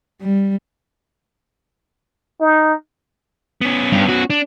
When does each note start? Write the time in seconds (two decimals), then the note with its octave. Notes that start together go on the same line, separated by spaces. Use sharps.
0.21 G3
2.41 D#4
3.61 B3 C#4
3.93 G2
4.09 F#4
4.30 D4